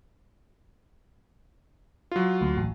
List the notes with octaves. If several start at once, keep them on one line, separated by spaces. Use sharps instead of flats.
F#3 F4
D2
A1